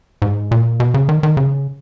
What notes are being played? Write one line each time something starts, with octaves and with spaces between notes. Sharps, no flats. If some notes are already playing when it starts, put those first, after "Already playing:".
G#2
A#2
B2
C#3
D#3
D#3
C#3